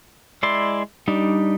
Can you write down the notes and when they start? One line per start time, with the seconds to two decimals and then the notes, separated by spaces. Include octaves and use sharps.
0.43 G#3 E4 D5 C6
1.08 G3 D4 D#4